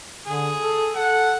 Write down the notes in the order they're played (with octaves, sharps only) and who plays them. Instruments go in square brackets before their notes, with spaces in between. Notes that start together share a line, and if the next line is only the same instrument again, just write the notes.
[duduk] D3 [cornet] G#4
[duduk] A4
[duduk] A4 [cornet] F#5